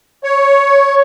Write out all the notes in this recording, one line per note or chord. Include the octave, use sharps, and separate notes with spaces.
C#5